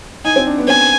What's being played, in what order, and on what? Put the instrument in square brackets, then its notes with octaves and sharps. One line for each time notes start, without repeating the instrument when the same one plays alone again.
[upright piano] D#4 [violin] G#5
[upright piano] C4
D4
B3
[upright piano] C4 [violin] G#5